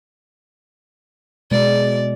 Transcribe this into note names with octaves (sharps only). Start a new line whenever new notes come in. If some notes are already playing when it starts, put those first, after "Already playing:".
B2 G#3 D5